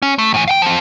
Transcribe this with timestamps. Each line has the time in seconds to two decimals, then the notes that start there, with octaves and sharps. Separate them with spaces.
0.02 C#4
0.18 A3
0.34 A2 E3
0.48 F5 G5
0.62 F3 C4